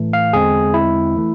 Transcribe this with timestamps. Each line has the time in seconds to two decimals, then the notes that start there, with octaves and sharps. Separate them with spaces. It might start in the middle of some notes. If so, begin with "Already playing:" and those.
Already playing: A2 E3 A3
0.13 F5
0.33 E2 D3 G#3 C4 G#4
0.74 E4
1.16 E3 A3